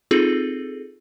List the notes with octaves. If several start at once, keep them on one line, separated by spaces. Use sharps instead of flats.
C4 D#4 F4 G#4 A4